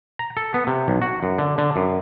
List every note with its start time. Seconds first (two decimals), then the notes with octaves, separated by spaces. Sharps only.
0.19 A#5
0.37 A4
0.54 B3
0.67 C3
0.88 B1
1.02 F#4
1.23 F#2
1.38 D3
1.58 D3
1.76 F#2